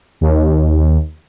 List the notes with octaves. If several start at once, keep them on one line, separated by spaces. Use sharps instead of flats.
D#2